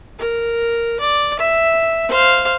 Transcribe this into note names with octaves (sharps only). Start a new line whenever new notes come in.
A#4
D5
E5
C5 F5